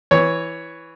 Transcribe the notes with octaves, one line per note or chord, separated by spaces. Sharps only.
E3 C#5